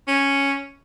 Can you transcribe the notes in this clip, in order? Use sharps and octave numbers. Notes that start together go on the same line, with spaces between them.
C#4